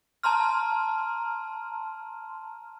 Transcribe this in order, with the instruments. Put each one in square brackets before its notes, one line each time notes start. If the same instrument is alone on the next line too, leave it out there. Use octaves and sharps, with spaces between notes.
[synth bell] A5 A#5 C6 F6